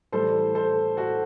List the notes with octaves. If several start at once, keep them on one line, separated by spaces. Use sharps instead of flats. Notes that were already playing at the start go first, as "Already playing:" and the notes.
A2 E3 G3 A4 C5
A4 C5
F#4 A4